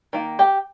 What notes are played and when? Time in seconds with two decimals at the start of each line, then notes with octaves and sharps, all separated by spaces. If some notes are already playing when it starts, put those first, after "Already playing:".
0.13 D#3 A#3
0.39 G4 G5